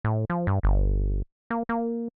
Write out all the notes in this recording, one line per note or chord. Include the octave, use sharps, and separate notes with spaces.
A2
F3
G2
G1
A#3
A#3